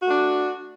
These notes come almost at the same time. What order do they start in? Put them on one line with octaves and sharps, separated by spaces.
F#4 A3 D4